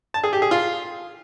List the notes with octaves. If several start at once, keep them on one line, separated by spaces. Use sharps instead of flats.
A5
G#4
G4
G#4
F4